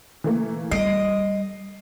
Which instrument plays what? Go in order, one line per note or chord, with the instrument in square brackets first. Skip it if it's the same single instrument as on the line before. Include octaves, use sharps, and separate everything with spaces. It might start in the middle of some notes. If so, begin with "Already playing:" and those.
[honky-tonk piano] E3 A3 A#3
[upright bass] G3 [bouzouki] D#5 [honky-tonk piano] C7 D7